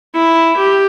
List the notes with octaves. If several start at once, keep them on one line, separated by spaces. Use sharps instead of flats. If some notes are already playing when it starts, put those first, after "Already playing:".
E4
G4